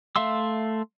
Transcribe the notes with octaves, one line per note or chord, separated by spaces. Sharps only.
A3 E5 F5 C6 E6